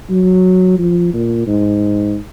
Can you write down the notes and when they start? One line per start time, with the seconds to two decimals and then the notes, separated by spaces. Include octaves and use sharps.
0.10 F#3
0.79 F3
1.13 A#2
1.47 G#2